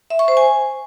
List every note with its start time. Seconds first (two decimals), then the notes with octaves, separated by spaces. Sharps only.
0.10 E5
0.19 C#6
0.28 C5
0.37 G#5